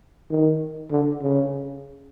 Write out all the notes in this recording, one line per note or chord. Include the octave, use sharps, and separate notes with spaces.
D#3
D3
C#3